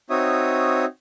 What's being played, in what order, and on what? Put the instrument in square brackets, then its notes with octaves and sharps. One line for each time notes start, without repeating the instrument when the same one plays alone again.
[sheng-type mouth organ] C4 D#4 F#4 C#5 E5 D#6